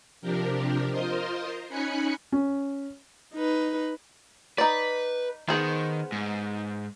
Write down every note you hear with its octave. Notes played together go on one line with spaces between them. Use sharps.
C3 F3 D4 G4 A#4
F4 A#4 C5 D#5 C6
C#4 D#4 G#5 B5 F#6 C#7
C#4
D#4 B4
D#4 B4 D5
D#3 B3 G#4 C5
G#2